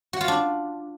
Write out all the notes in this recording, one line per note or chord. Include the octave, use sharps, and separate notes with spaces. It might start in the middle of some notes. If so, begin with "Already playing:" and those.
F#4
F4
D4